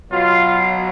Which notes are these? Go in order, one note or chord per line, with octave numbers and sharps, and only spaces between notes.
B2 F#3 F4